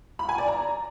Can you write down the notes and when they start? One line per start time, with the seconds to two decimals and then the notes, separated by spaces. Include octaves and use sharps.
0.19 B5
0.29 G#5
0.38 D5
0.48 A#5